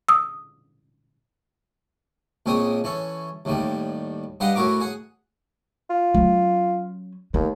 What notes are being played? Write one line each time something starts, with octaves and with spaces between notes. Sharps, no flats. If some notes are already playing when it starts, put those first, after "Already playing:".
D#6 E6
A#1 A#2 G#3 C4 C#4 D#6
E3 C#4 A4
D#2 A2 D#3 G3
G2 G4 B4 D#5 F5 F#5
A2 B3 E4 F#4 A#4 D6
G#4 F#5
F4
F#3 C#4
D#2 A3